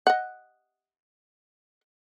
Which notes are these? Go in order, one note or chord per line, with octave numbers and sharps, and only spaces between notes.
D#5 F#5